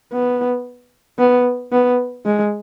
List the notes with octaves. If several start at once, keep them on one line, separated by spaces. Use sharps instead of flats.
B3
B3
B3
G#3